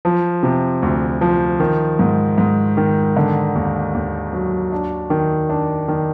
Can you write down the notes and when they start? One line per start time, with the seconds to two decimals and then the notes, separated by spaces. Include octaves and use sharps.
0.05 F3
0.43 C3
0.82 D2
1.21 F3
1.60 D#3
1.99 G#2
2.38 G#2
2.77 D#3
3.17 D3
3.55 D#2
3.94 D#2
4.33 F#3
4.72 D4
5.10 D#3
5.49 D4
5.88 D#3